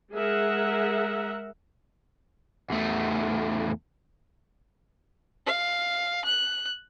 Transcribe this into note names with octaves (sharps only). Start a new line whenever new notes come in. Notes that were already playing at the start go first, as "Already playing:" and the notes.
G#3 G#4 A#4 E5 F#5
E2 A3
F5
F#6